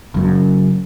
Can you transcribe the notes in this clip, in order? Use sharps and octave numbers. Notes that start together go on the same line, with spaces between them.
F#1 F#2